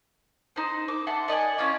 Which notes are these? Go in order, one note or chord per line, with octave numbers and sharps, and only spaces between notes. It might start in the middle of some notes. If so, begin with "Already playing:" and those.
D#4 C5
D6
E5 F#5 A5 C6
D5 D#5 F#5 G#5
C#4 E4 F4 D5